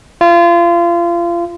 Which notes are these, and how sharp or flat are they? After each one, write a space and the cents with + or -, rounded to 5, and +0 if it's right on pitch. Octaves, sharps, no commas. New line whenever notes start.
F4 -30